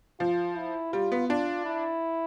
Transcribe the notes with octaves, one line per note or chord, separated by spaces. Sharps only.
F3 F4
E4
G3 F4
B3
D4 F4
E4